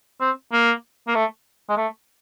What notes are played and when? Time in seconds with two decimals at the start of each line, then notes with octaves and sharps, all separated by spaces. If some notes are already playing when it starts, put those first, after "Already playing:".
0.21 C4
0.52 A#3
1.07 A#3
1.15 A3
1.69 G#3
1.77 A3